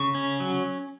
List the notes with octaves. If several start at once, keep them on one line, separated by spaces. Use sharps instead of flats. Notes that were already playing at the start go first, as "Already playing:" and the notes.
Already playing: C#3 C#6
C#4
F#3